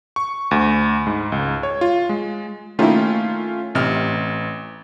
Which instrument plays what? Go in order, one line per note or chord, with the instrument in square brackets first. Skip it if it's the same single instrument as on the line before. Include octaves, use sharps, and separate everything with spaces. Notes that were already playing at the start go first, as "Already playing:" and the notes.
[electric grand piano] C#6
D2
G#2
C#2
C#5
F4
G#3
[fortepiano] D#3 A#3 E4 [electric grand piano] A3 C#4 F4
[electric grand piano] A1 [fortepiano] C3 F6